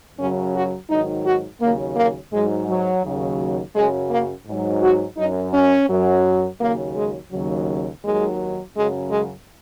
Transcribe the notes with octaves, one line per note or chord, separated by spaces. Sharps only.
F#2 C#3 F#3 C#4
F#4
G#2 D#3 F#3 D#4
F#4
D#2 C#3 F#3 A#3
A#3
G#2 F#3 G#3
F#3
D#2 C#3 F#3
F#2 C#3 F#3 G#3
A#3
G#2 F#3
F#4
F#2 F#3 D#4
C#4
F#2 F#3
D#2 C#3 F#3 A#3
G#3
D#2 C#3 F#3
D#2 D#3 F#3 G#3
F#2 C#3 F#3 G#3
G#3